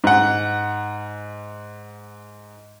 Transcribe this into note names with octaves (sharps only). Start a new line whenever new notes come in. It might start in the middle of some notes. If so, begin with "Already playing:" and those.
G#2 F#5